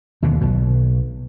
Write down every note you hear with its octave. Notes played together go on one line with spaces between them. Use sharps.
D#2 B2 D3
B1 B2